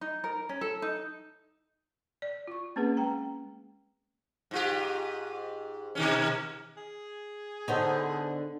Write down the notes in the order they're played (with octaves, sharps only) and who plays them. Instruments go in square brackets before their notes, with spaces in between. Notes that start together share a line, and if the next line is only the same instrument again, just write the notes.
[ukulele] D#4
A#4
C#4
A4
D#4
[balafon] D5
F4 C#6
A#3 C4 C#4 G#4 B4 F#5
G#3 G5 A#5
[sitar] G#2 F4 G4
B2 D#3 C#4
[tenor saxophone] G#4
[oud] D3 B3 D#4 [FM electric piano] A4 C5 C#5